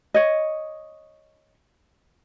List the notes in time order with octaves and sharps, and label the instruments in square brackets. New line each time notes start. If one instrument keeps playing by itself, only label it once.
[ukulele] C#5 D#5